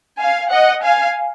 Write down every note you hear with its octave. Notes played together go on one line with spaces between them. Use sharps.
F5 G#5
D#5 F#5
F5 G#5